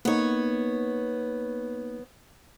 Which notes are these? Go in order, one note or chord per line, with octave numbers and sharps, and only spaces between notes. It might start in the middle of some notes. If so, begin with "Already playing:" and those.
A#3 B3 D#4 C#5